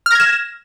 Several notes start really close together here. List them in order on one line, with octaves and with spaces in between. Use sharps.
F6 A#6 G#6 E7